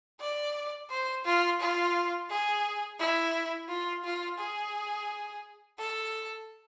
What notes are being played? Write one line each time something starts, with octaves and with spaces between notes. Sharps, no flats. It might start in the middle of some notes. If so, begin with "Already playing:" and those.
D5
C5
F4
F4
G#4
E4
F4
F4
G#4
A4